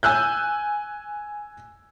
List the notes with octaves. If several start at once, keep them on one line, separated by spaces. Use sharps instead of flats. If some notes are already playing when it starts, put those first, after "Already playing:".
G#5 E6 F#6 G6